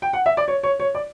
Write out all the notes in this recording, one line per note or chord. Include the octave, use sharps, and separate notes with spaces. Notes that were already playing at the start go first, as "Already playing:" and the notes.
G5
F#5
E5
D5
C#5
C#5
C#5
D5